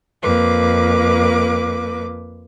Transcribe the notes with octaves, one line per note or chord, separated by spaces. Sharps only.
F2 A#3 B4 D6